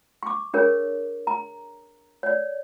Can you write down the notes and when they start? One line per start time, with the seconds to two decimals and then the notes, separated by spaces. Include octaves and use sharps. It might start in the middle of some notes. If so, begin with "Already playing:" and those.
0.23 C#6 D6
0.54 D4 G#4 A#4 C#5
1.27 A#5
2.23 C#5 D5